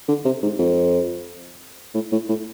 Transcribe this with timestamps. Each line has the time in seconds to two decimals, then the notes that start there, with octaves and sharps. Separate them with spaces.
0.09 D3
0.25 C3
0.43 G#2
0.59 F2
1.94 A2
2.12 A2
2.29 A2